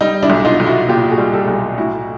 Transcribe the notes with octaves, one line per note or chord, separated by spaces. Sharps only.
G3 D#4
D4 E4
B1
D#4 F4
B1
E4 F#4
A#2 F4 G4
F#4 G#4
G3
G4 A4
B1
A2 E4 F#4